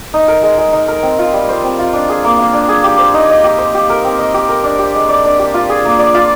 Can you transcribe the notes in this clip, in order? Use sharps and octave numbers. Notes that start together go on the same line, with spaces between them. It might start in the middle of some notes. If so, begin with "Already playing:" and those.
D#4
A#4
G#3
G#3
D#4
A#4
C4
F4
G3
C5
C4
F4
D4
G#4
A#3
A#3
D4
G#4
G4
C5
D#4
D#5
G4
C5
G4
A#4
C4
D#5
G4
A#4
D4
G4
G#3
D5
D4
G4
F4
G#4
A#3
D5
F4